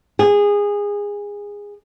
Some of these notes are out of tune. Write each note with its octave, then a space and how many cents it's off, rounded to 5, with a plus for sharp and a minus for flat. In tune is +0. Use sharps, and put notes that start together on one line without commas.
G#4 -20